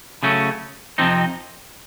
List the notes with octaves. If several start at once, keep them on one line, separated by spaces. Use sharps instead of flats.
C#3 F#3 A3 C#4
F2 C3 F3 C4 D#4